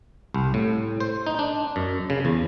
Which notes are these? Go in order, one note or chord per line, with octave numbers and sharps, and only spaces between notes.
C2
A2
C5
D#4
D4
F#2
C#3
E2